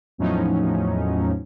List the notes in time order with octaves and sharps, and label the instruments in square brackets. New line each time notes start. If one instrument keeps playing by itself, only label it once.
[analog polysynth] E2 A2 F3 F#3 C#4 D#4